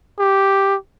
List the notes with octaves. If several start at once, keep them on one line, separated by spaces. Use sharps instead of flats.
G4